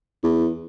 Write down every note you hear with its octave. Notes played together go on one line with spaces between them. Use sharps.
E2